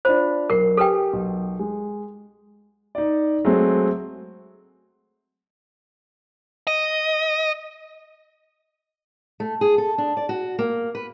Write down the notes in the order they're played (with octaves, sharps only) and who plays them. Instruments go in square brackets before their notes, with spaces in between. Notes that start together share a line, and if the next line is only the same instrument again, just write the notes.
[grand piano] D4 F4 B5 [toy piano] C5
[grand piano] B1 C7 [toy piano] A#4
[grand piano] G4 G#5 [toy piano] A4 B4 G5
[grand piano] B1
G#3
D#4 D5
F#3 G#3 A3 C4
[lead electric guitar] D#5
[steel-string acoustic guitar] A3
G#4
A4
D4
D5
F#4
A#3
B4